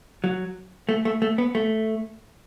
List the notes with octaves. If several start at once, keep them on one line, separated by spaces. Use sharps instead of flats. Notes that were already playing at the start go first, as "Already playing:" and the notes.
F#3
A3
A3
A3
B3
A3